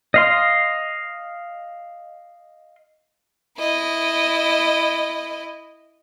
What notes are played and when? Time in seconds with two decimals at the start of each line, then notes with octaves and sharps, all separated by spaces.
0.14 D#5 F5 C6
3.59 E4 D#5